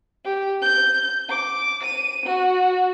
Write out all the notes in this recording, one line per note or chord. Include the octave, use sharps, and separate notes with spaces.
G4
G6
D6
D#7
F#4